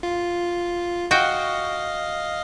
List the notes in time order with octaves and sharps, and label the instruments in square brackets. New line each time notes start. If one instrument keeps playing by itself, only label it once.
[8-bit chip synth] F4
[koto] F#4 G5 [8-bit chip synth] D#5 F5